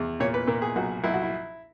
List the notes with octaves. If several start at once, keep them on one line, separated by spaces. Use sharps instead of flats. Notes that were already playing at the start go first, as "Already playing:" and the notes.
Already playing: E2
A#2 C#5
B4
A#2 A#4
G#4
B1 F#4
B1 E4
F#4
E4